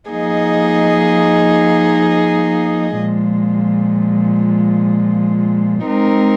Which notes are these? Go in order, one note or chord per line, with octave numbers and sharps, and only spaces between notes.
F3 A#3 D#4 G#4 D#5
A#2 F3 G#3
G#3 C4 D#4 A#4